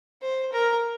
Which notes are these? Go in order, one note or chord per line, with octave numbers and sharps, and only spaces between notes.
C5
A#4